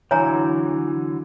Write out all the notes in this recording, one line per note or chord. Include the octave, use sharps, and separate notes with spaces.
D3 E3 F#3 C#5 G#5 A#5